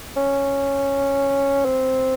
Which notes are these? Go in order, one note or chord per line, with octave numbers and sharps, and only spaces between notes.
C#4
C4